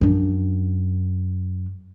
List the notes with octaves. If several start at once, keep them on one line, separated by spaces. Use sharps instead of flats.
F#2 D4